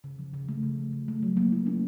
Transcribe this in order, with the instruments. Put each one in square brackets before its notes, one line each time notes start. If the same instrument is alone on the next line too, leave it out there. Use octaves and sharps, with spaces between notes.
[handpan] C#3
F3
C#3
A3
C#3
F3
C#3
A3
F#3
A#3
E4
C#4